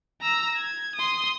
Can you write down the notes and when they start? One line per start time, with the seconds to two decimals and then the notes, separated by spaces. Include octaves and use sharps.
0.21 A#5 E6
0.56 G#6
0.95 C6 D#6